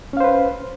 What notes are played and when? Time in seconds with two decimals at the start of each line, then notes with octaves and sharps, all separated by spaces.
0.13 C#4
0.17 F5
0.20 C5
0.24 B4